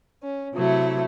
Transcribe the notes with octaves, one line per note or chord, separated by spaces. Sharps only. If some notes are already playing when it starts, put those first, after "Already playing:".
C#4
C3 F#3 A3 E4